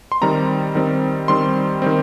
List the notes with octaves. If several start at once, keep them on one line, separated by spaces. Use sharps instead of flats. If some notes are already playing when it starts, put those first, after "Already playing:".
C6
D#3 G3 C4 A#5
D#3 G3 C4
D#3 G3 C4 C6
D#3 G3 C4